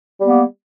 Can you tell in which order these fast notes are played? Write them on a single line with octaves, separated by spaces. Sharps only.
G3 B3 A#3